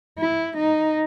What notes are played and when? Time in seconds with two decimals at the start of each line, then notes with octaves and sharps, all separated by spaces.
0.18 E4
0.57 D#4